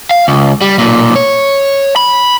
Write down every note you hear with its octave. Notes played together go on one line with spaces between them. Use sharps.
F5
C#2
G3
B1 A#2
C#5
B5